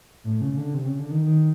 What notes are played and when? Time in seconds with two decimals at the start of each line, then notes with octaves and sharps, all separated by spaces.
0.24 A2
0.41 C#3
0.57 D3
0.74 C3
0.86 C#3
0.99 D3
1.11 D#3
1.23 D#3